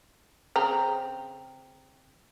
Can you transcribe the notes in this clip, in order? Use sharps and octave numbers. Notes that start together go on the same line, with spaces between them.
C#3 C4 A#5